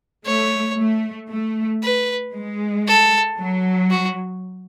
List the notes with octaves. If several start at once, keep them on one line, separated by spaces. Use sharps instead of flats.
A3 C#5
A3
A3
B4
G#3
A4
F#3
F#4